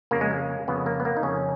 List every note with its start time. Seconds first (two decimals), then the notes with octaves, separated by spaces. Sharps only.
0.11 F2 C#3 A#3
0.21 G#3
0.31 A#3
0.68 F2 C#3 B3
0.86 A#3
1.00 B3
1.05 A#3
1.17 D#4
1.23 F2 C#3 C#4